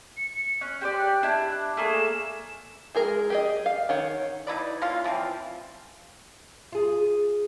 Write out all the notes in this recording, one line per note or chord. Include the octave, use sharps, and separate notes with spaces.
C#7
C#4 F#6
G4 C5 D5
D4 E4
A3 A#3 G#4
E7
G#3 G#4 A#4
G4 G#4 D#5
F5
D#3 C#5 F#5
D#4 E4 B4 D5
A#3 C#4 E4 F4
E3 F3 A#3 C4
F4 G#4